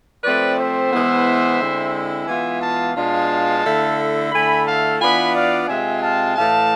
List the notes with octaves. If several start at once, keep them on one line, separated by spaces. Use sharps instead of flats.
F3 A3 C4 B4 D5
C5 E5
E3 G#3 B3 E4
D3 G#3 C4 E4
E3 G#3 B3 F4 E5 G#5
F5 A5
B2 G#3 D4 F4 F5 A5
D3 A3 E4
D3 A3 E4 G#5 B5
F5 A5
E3 B3 D4 F4 G#5 B5
D5 F5
C3 G#3 C4 F4 E5 G#5
F5 A5
A2 E3 A3 F5 A5